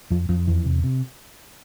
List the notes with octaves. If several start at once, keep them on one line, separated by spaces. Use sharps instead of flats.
F2 F3
F2 F3
E2 E3
C3
C3